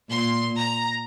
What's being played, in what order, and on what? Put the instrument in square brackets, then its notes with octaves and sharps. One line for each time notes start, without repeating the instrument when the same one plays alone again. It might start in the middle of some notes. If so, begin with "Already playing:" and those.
[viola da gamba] A#2 [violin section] C6
[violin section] A#5